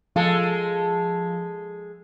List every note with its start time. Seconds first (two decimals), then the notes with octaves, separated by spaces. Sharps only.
0.16 F3 G#3 A4